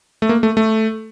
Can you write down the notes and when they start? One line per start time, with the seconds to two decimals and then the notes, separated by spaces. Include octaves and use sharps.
0.22 A3
0.29 A#3
0.43 A3
0.57 A3